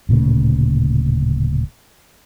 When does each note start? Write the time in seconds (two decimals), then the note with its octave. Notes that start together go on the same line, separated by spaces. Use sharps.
0.09 D1 A#2 C#3 A3